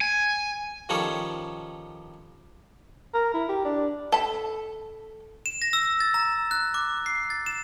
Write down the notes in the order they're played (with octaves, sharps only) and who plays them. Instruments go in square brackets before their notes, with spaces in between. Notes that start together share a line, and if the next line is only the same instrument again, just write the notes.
[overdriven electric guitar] G#5
[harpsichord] D#3 F3 G3 C#4 A4 C#5
[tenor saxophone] A#4
E4
G4
D4
[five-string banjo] A4 B5
[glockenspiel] E7
A#6
E6
A6
A#5
F#6
D6
C7
A6
E7